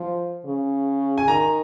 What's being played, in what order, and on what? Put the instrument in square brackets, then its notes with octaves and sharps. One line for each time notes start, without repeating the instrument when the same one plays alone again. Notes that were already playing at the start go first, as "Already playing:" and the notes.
Already playing: [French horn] F3
C#3
[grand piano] G#5
[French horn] D#3 [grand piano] A#5